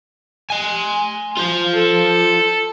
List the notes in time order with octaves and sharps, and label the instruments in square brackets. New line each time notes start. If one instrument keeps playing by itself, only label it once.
[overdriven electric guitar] G#5 C6
F4 C5
[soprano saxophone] A4